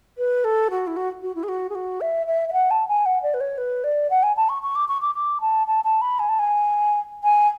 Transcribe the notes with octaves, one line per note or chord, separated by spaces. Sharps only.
B4
A4
F#4
E4
F#4
F#4
E4
G#4
F#4
G#4
F#4
E5
E5
E5
F#5
A5
G#5
F#5
D5
B4
C#5
B4
D5
F#5
G#5
A5
C#6
C#6
D6
C#6
D6
D6
A5
A5
A5
B5
G#5
A5
G#5
G#5